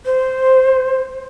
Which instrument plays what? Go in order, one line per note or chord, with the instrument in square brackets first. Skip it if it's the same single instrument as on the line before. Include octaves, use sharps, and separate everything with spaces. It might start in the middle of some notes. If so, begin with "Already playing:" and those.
[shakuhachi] C5